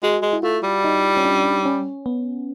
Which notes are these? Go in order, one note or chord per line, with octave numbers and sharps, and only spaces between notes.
G#3 F#4
G#3
E4
A3 F4
G3
D#4
C#4
D4
C#4
B3